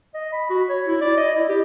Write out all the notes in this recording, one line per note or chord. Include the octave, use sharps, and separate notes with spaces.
D#5
B5
F#4
C#5
E4
D5
D#5
E4
G4